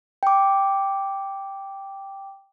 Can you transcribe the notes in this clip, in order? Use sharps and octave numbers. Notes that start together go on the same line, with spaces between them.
G5 D6